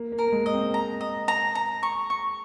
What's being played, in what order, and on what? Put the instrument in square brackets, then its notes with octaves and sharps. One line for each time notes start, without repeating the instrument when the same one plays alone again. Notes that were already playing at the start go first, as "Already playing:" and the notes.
Already playing: [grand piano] A#3
A#3
[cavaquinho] A#4
[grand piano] A#3
G#3
[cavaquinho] D#5
[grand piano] C4
[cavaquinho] A#5
D#5
A#5
A#5
C#6
C#6